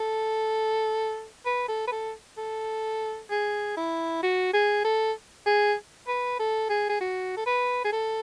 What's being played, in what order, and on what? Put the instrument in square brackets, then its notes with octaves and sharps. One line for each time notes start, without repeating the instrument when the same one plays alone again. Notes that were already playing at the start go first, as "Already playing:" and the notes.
Already playing: [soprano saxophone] A4
B4
A4
B4
A4
A4
G#4
E4
F#4
G#4
A4
G#4
B4
A4
G#4
G#4
F#4
A4
B4
G#4
A4